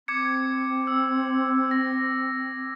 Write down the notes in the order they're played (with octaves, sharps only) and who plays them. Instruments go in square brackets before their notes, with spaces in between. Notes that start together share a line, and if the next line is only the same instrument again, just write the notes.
[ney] C4 [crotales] D6 G#6 C#7
[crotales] E6
A#6